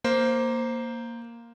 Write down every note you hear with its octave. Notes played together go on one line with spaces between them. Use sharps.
A#3 C5